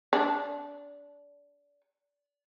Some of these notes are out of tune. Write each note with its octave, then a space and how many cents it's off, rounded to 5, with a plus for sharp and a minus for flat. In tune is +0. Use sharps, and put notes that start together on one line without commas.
D4 -25